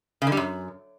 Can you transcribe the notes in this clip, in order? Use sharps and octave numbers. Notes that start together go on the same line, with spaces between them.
C#3
D3
G3
F#2